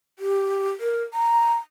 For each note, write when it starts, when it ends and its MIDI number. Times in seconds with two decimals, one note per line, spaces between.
0.19 0.69 67
0.80 1.03 70
1.14 1.54 82